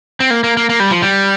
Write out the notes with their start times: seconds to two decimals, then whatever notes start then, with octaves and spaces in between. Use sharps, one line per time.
0.20 C4
0.30 A#3
0.44 A#3
0.57 A#3
0.70 A#3
0.80 G3
0.91 F3
1.02 G3